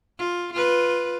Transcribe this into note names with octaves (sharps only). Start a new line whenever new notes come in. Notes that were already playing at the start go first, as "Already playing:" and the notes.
F4
F4 B4